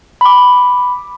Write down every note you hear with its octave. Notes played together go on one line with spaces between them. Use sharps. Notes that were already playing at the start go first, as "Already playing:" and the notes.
B5 D6